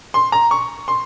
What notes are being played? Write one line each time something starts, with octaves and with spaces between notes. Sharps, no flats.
C6
A#5
C#6
C6